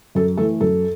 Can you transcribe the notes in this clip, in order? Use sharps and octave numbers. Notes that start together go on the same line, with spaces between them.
F#2 A4
E3 A3 A4
F#2 A4